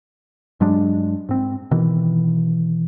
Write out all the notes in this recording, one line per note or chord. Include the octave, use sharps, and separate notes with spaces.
G2 F#3 G#3 D4
G#2 C4
B2 D#3 E3